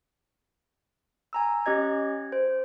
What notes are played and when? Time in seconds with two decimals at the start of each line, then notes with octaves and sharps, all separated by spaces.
1.33 G#5 A#5 E6
1.66 C#4 G4 D#5 G#6
2.32 C5